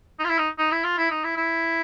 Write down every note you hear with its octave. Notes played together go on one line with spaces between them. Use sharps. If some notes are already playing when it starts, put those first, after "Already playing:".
D#4
F4
E4
D#4
D#4
E4
F4
E4
D#4
E4
E4